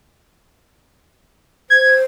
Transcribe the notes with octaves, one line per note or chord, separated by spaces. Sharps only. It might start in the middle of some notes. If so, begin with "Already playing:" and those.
C5 G#6